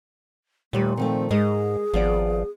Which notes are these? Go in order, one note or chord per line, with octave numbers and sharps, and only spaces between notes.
D#2 A#2 G3 A3 B4
D#3 F3 A3 C4
G#2 G#3 G#4 A#4 D#5
G#1 F3 B3 D5